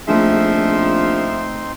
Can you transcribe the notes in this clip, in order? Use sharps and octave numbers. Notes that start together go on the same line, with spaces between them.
A#1 F3 A3 C4 D#4 G#4 E5 C6